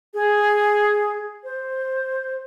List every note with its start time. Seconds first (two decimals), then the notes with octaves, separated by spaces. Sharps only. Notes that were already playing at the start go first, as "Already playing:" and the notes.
0.14 G#4
1.44 C5